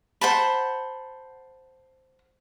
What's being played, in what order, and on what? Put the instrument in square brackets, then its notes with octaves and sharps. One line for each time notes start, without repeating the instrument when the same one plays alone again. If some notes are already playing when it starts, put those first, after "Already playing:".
[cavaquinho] C5 F#5 A5 B5